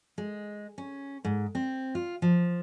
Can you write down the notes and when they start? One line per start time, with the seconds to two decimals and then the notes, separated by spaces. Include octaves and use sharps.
0.18 G#3
0.78 C#4
1.25 G#2
1.55 C4
1.95 F4
2.22 F3